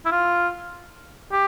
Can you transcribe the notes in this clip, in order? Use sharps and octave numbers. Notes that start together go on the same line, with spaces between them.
E4
F4
G4